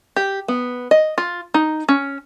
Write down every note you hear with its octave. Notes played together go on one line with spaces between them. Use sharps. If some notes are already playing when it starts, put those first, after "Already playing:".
G4
B3
D#5
F4
D#4
C#4